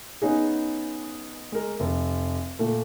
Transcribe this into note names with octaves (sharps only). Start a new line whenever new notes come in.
B3 C#4 D#4 G#4
G#3 A#4
F1
A#2 A3